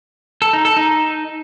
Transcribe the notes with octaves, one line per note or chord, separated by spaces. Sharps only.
A4
D#4
A4
D#4